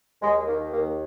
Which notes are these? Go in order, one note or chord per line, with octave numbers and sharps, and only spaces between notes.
D#2 G#3
D#3 A#3
D#2 A#3